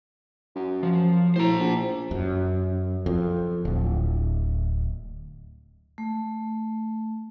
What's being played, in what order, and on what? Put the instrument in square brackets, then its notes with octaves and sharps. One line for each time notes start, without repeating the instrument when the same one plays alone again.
[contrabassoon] F#2
[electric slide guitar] F3
[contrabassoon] A2 [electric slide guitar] C5 A#5
[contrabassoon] A#1
[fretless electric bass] F#2
F2
D1
[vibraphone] A3